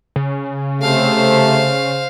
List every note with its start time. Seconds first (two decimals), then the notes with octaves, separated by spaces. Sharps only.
0.16 C#3
0.82 C3 A3 C5 F5